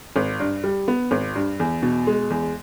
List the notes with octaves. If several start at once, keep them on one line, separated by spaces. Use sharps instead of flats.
G#1
G2
G3
B3
G#1
G2
E2
B2
G#3
E2